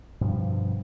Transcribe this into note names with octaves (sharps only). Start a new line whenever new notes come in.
G2 B2 F3